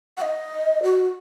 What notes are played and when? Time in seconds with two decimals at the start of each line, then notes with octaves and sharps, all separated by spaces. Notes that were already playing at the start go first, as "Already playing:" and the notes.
0.17 F#5
0.22 D#5
0.83 F#4